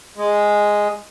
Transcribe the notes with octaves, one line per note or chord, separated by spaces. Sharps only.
G#3